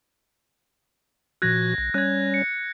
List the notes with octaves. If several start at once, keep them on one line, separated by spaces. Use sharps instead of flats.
A#2 F3 F#4 F#6 G#6 A#6
B1
G3 C#4 C#5 F#6 G#6
C#7